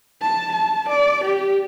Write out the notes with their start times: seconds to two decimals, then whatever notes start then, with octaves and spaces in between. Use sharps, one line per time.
0.22 A5
0.53 A5
0.89 D5
1.24 G4